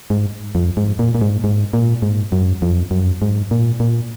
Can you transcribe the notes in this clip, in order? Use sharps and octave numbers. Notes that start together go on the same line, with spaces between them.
G#2
F2
G#2
A#2
A#2
G#2
G#2
A#2
G#2
F#2
F2
F#2
G#2
A#2
A#2